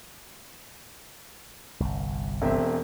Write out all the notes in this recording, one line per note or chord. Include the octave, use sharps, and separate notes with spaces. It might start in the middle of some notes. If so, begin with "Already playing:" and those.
G1 C2
E1 C4 E5